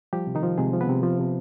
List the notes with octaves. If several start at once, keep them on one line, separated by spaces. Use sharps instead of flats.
F3 G3 G4
C3
D#3 D#4
F3
C3 G#3 G#4
F3
B3 B4
C3
F3
C3